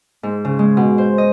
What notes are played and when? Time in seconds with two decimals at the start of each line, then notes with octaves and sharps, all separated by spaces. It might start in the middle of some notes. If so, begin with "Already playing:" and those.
0.23 G#2
0.45 C#3
0.59 G#3
0.77 B2
0.98 C5
1.18 D#5